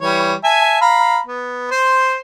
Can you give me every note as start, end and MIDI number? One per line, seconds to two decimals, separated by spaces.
0.01 0.34 52
0.01 0.34 55
0.01 0.34 73
0.44 0.79 76
0.44 0.79 80
0.44 0.79 81
0.81 1.19 77
0.81 1.19 82
0.81 1.19 83
1.27 1.69 59
1.71 2.18 72
1.71 2.18 84